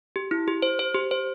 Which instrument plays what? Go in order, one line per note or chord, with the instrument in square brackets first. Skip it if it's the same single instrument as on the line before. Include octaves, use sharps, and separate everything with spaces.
[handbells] G4
E4
G4
C5
C5
G4
C5